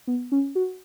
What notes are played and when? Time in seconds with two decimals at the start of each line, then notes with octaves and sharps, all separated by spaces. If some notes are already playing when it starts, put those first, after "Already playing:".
0.07 B3
0.32 C#4
0.55 F#4